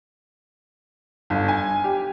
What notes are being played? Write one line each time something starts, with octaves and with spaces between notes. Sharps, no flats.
G1
G#5
G4